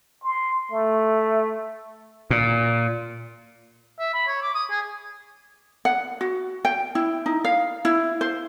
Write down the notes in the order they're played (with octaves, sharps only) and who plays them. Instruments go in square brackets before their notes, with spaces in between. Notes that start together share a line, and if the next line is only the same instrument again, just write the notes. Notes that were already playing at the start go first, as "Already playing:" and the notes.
[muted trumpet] C6
A3
[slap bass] A#2
[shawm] E5
B5
C#5
D6
D#6
G#4
[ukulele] F#5
F#4
G5
E4
D#4
F5
E4
C5